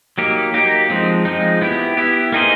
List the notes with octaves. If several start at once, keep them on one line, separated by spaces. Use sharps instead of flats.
F#3 A#3 D#4 G4
F#3 A#3 D#4 G4
F3 G#3 C4 D#4
F3 G#3 C4 D#4
B3 E4 G4
B3 E4 G4
A#3 D#4 G#4 C5